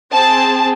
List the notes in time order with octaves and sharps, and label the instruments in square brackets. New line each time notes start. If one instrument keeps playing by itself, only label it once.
[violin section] C4 G#4 A5